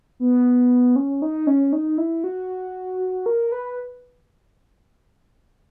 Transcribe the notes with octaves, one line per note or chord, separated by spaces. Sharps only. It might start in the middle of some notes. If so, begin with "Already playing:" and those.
B3
C#4
D#4
C#4
D#4
E4
F#4
A#4
B4